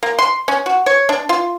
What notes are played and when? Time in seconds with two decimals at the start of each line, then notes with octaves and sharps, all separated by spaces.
0.03 A#3
0.19 C6
0.48 C#4
0.66 F#4
0.86 C#5
1.09 D4
1.29 F4